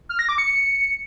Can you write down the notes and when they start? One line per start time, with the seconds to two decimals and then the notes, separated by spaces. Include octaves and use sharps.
0.09 F6
0.19 A#6
0.29 D6
0.38 C#7